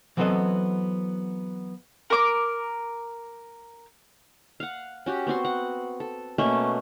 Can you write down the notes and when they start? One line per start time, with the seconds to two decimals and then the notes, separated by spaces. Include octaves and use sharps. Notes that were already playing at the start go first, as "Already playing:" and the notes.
0.17 E3 F#3 B3 C4 A4 D#5
2.10 A#4 D6
4.60 F5 F#5
5.06 C#4 F#4 G4
5.27 B3 C4 F#4 C6
5.45 F#5
6.00 A4
6.38 B2 A3 A#3 C#4